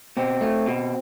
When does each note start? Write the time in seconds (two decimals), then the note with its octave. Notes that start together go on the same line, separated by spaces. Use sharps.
0.17 B2 C4
0.41 A3
0.67 B2